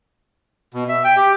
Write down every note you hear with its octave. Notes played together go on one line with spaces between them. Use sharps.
B2
E5
G5
G4